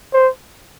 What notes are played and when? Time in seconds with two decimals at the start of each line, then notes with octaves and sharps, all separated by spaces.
0.14 C5